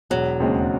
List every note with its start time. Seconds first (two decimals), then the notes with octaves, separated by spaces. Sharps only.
0.10 E1 F#3
0.40 D#2 C#3 G#3 C4